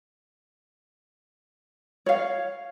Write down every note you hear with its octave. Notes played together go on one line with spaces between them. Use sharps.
C#5 F5